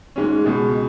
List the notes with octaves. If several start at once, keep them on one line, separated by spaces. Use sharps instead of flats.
G#2 G#3 C#4
C#2 B2 G#3